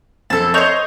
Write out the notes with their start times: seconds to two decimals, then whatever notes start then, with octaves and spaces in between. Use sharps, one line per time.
0.30 F2 A4 A5
0.54 C5 C#5 D#5 G6 F7